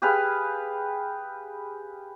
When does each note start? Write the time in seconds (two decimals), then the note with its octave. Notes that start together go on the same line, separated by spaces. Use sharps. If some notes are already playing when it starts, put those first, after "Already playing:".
0.02 G4 G#4 B4 F5